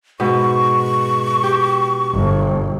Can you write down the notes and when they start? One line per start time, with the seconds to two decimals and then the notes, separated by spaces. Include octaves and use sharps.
0.20 G#2 B2 C#6
1.43 G4
2.14 G1